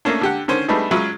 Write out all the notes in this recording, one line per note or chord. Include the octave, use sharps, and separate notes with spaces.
A3 A#3 C#4 D4
D3 G4 F#5
D3 D#3 C#4 C5
G3 A3 B3 D4 D#4 G#4
F#3 G#3 C#4 F4 E5 B5